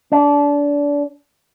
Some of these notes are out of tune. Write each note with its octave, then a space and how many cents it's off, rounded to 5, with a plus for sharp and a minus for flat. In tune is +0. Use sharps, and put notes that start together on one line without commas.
D4 -25